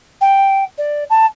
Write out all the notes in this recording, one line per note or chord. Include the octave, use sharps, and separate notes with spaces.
G5
D5
A5